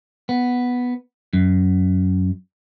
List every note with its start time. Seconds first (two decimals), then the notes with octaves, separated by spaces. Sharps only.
0.29 B3
1.33 F#2